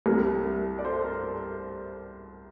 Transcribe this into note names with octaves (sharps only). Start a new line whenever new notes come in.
C2 C3 G3 A#4
D5
A4 C5
A#4